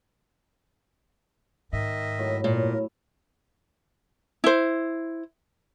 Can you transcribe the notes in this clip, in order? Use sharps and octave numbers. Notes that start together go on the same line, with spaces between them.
G#2 D#3 D#5 E5
A2 F#3
A#2 A#4
E4 C5